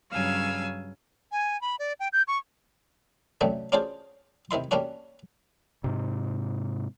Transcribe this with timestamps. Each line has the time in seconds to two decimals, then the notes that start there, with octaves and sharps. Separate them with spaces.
0.12 G2 C#3 F#3 F5 G#5 E6
1.32 G#5
1.61 B5
1.79 D5
2.00 G5
2.13 G6
2.28 C#6
3.41 F#2 C3 F#3 G3 A3
3.72 C#4 D4 F4 F#4 G#4 C5
4.51 C3 D#3 E4 C6
4.71 G3 A#3 C#4 D4 F#4
5.84 G#2 C3